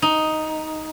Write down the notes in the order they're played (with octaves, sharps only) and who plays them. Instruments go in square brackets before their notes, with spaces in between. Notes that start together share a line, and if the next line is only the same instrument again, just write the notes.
[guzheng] D#4